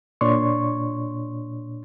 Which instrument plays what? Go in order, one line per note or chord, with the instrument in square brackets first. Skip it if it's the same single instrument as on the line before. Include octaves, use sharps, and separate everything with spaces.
[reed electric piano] A#2 D4 C#5 D5 C6 C#6